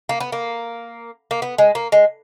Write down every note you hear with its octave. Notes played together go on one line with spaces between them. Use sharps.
A#3
B3
A#3
A#3
B3
G#3
A#3
G#3